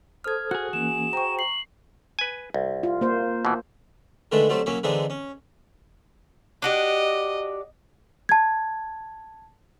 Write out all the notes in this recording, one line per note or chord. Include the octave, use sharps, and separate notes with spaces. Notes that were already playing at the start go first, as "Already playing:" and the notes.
A4 C5 D#6 F6 G#6
F#4 G#4 F#6
E3 A#3 C#4 G#5 E7
C5 G5 A#5 C#6
C7 F#7
B4 G#5
C2
F4
A#3 C5
B2 E3
D3 D#3 G#3 A3 D4 B4
F#3 G3 A3 C4 C5
F#3 A#3 C#4 E4
D3 E3 G#3 C4 D4 D#4
C#4
D4 F#4 G4 D#5
A5 G#6